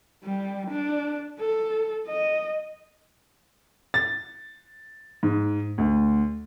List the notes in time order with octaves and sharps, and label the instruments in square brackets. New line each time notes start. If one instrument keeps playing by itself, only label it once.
[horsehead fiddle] G3
D4
A4
D#5
[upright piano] A6
G#2
D2